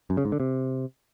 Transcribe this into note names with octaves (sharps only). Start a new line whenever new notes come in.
F#2
C#3
G#2
D3
C3